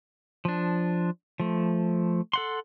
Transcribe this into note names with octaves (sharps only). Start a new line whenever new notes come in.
F3 D4
F3 A3
A4 F#5 C6